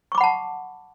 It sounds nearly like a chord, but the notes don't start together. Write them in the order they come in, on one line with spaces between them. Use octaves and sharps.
C#6 D6 B5 F#5 A5